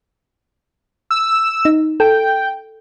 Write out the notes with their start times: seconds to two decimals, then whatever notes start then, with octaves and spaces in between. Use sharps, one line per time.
1.11 E6
1.65 D#4
2.00 A4 G5